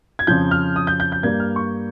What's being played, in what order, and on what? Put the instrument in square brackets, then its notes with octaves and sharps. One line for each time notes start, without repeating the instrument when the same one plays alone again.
[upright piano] G#6
F2 C#3 F3 G6
F6
D#6
G6
G6
G6
G2 G3 A#3 G#6
F6
C#6